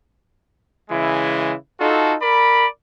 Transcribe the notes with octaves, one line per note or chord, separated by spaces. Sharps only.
C#3 E3 G#3 E4
D#4 F4 F#4 A4
A#4 D5 B5